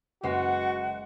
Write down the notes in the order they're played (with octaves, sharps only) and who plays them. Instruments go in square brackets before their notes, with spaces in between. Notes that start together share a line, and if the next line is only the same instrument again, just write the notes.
[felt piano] F#1 B4 C7 [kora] G#3 [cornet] F#4 [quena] F#5